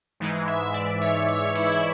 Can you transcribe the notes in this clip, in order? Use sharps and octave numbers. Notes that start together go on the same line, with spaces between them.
G#2 E3 G#3
E5
D5
C#5
C#5
E4